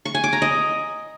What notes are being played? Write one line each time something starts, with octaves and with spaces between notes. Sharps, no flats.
C#6
G#5
D6
A#5
D#5